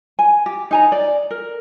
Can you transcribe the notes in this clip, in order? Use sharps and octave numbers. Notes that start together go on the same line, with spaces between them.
G#5
G4
D#4 G#5 A#5
D5
A#4